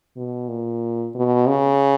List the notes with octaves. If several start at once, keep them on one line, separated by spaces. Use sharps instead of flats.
B2
A#2
B2
C#3